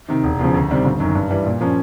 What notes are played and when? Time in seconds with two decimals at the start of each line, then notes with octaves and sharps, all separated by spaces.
0.09 C3 D#3
0.23 E1
0.39 E2 C#3 F3
0.54 D2
0.70 C3 D#3 G3 C4
0.85 G1
1.00 F#2 D#3
1.15 G2
1.30 E3 G3
1.46 A#2
1.61 F3 A#3 C#4